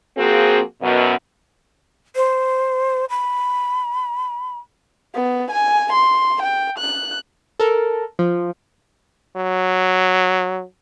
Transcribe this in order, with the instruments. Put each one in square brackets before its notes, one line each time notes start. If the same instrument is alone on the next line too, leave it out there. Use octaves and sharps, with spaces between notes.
[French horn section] F3 A#3 C4 F#4 G#4
F#2 B2
[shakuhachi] C5
B5
[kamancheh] B3
G#5
C6
G5
F#6
[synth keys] A4 A#4
F3
[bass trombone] F#3